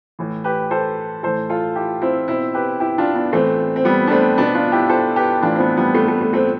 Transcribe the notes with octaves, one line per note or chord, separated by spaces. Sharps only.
A2 E3
G4 B4
A4 C5
A2 E3 A4 C5
F4 A4
E4 G4
C4 E4
B2 C4 E4
G4 B4
E4 G4
D4 F4
B3 D4
A2 E3 A3 C4
C4
G3 B3
D4
A3 C4
B2 B3 D4
D4 F4
E4 G4
A4 C5
G4 B4
A2 E3 D4 F4
C4
B3 D4
G3 B3
A3
A3
A3
A3 C4